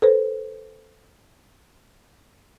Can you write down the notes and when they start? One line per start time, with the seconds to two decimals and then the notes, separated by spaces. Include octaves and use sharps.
0.02 A4 B4 C5